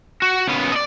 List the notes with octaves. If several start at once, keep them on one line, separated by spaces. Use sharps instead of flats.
F#4
C#3 B3
D5 D#5